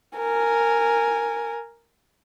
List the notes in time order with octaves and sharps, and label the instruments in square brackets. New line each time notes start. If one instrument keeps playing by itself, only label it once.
[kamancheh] A#4 G#5